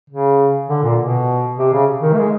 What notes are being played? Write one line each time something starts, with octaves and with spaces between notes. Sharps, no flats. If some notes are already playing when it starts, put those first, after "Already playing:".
C#3
D3
A#2
B2
C3
C#3
D#3
A3
G#3